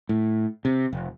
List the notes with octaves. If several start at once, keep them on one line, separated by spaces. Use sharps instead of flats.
A2
C3
F1